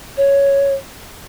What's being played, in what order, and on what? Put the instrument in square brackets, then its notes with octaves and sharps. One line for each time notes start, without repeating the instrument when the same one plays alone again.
[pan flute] C#5